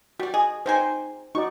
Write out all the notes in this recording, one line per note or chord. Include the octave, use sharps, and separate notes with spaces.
G3 F#4 D5
G#4 D#5
G#3 D#4 C5 G5 G#5
D#4 F#4 D5 C#6